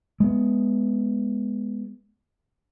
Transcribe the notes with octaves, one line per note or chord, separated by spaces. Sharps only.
G#3 B3